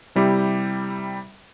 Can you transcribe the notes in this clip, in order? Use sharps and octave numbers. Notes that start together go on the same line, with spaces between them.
C3 G3 E4 G4